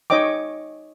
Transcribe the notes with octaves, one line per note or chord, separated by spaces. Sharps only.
D#4 C#5 D#5 G5 D6